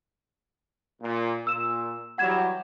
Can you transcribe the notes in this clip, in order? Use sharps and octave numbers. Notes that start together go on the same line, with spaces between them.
A#2
A#2 E6 E7
E3 F#3 G3 F#5 G#6 E7